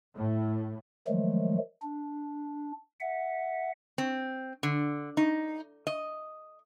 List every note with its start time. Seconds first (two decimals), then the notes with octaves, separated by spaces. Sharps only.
0.14 A2
1.08 D#3 F3 F#3 G#3 A3
1.82 D4
3.00 E5 F#5
3.98 C4
4.63 D3
5.17 D#4
5.87 D#5